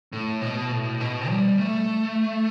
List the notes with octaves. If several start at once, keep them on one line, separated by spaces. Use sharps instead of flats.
A2
B2
A2
B2
G3
A3